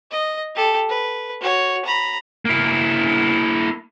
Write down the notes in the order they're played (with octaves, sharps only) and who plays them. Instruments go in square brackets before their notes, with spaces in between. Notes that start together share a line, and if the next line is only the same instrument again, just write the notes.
[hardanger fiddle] D#5
G4 A4
B4
F#4 C#5
A#5 B5
[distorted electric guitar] A#3 E4